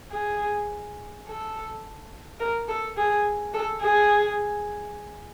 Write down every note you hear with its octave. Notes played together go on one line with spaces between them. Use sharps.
G#4
A4
A#4
A4
G#4
A4
G#4